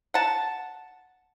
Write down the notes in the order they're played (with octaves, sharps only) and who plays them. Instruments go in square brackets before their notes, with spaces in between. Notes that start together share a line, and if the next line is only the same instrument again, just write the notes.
[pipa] F#5 A5